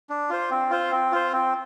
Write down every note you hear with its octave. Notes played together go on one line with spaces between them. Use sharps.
D4
F4 C5
C4
F4 C5
C4
F4 C5
C4